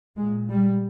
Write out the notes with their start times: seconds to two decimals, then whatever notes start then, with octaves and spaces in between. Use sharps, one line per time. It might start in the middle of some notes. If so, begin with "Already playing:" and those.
0.18 A#2 G#3
0.50 G3